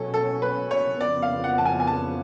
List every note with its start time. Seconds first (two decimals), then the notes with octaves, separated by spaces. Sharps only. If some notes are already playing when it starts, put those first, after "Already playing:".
Already playing: B2 F#3 C#4 A4
0.14 A4
0.42 B4
0.71 C#5
1.00 F2 C#3 F3 B3 D5
1.22 F5
1.44 F#5
1.58 A5
1.65 G#5
1.80 G#5
1.87 A5